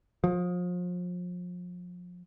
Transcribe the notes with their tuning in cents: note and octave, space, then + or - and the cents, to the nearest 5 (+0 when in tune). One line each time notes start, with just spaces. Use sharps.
F3 +35